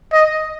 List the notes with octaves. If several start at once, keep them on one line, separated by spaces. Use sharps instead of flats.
D#5